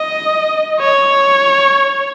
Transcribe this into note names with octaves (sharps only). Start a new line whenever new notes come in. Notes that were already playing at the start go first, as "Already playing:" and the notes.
Already playing: D#5
C#5